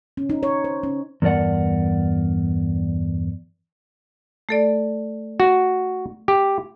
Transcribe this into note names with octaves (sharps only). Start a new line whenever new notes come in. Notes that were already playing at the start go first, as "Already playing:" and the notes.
C#4
D#4
C#5
C5
C#4
E2 G2 A#4 D5 F#5
A3 A4 D5
F#4
G4